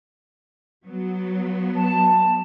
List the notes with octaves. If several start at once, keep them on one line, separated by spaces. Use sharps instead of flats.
F#3 B3
A5